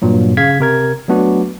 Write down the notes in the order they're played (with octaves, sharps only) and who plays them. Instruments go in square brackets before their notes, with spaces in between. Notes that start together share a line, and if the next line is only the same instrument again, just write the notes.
[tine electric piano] G2 A#2 F#3
C#3 F5 G#6 B6
C3 A#4 G#6
F#3 A3 B3 D4 F#4